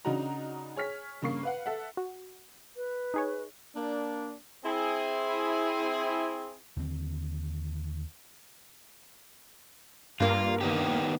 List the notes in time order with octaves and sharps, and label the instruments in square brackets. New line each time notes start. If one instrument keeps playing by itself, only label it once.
[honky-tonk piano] C#3 D4 D#4 F#4 A#5
G#4 C#5 F6 B6
G2 C#3 A#3 C#6 C7
B4 F5 F#5
A4 E5 F#5
[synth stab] F#4
[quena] B4
[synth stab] D#4 G#4 C#5
[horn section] A#3 D4
C4 E4 G#4
[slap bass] D#2 D3 G3 C4
[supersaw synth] G2 A#3 [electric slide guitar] F4
[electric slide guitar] D#3 B3 G4